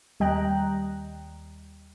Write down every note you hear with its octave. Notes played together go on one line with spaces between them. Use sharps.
D#2 G3 D#5 G5 A#5 F#6